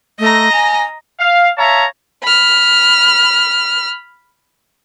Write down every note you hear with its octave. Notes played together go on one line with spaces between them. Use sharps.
A3 D#5 A#5
G#5
F5
C#5 E5 F5 A5 A#5
B5 F6